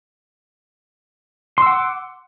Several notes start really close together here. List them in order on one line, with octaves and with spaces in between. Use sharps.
C6 E6 F#5 D6